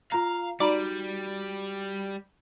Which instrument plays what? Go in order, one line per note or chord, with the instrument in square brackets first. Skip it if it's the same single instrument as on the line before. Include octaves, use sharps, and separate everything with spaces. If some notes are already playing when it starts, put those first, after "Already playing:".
[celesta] F4 A#5 [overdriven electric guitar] F5
[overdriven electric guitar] G3 [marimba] D#4 A#5 B5 [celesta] F#4 [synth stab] D5